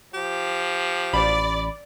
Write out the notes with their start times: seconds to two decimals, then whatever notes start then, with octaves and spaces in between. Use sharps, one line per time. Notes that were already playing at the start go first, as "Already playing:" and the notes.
0.14 F3 G4
1.13 A1 D5 B5